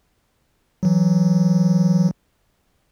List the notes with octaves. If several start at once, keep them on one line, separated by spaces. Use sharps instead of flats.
E3 F#3